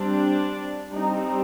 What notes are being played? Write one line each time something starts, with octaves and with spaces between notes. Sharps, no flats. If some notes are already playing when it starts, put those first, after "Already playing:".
Already playing: G3 C4 D4
G3 C4 D#4